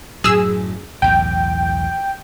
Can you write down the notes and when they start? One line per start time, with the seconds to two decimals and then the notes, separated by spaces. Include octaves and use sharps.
0.24 F#2 A2 F#3 G#4 E6
1.02 B1 E2 A2 G5